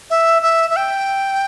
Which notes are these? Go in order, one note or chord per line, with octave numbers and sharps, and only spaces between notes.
E5
E5
E5
G5